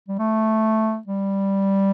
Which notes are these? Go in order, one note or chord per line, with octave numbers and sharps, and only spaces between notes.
G3
A3
G3